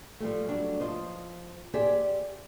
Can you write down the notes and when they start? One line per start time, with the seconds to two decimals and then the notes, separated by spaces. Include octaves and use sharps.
0.20 F3 G3 A3
0.48 F#3 G3 A3 D4
0.80 F3 C5 D#5
1.74 G4 G#4 C5 D5 E5